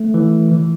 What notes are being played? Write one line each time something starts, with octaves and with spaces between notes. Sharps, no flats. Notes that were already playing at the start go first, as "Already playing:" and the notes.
Already playing: A3
E3
E3